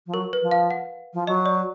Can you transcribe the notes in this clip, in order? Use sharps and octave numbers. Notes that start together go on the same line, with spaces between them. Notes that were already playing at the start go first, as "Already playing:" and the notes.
F3
F#3 A#4
B4
F3
F5
F#5
F3
F#3 D#5
D5